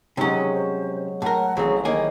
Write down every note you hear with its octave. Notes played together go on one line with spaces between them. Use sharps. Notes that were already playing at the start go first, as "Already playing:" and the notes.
C3 F#3 G#3 C#4 D#4
C5
A2 A#4 F#5
A1 F#3 C4 G#4
D#3 A#3 G#4 D#5